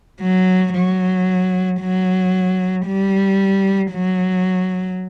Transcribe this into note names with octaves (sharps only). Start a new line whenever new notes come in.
F#3
F#3
F#3
G3
F#3